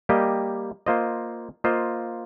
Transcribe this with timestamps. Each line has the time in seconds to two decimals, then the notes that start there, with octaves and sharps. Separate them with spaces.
0.09 G3 A#3 G4 D#5
0.86 A#3 F4 C5 D#5
1.64 A#3 F4 C5 D#5